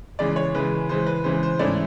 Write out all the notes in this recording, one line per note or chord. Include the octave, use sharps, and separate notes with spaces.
C#3 E3 G#3 D5
C#5
C#3 E3 G#3 B4
C#3 E3 G#3 C5
B4
C#3 E3 G#3 C5
C5
G#2 E3 A3 C#4 E4 D5